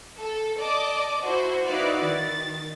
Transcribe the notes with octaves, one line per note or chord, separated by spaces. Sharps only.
A4
D5 D#5 A5 D6
E4 F#4 C5
D#4 E4 F#4 B4 D5 F5
D#3 A6